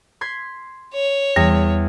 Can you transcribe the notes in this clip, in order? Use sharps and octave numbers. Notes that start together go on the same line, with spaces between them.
C6 G#6 B6
C#5
E2 G3